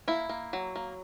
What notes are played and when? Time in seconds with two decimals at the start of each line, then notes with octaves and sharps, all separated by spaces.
0.08 A#3 E4
0.29 A#3
0.53 F#3
0.76 A#3